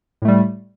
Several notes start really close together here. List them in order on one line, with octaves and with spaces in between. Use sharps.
A2 A3 G3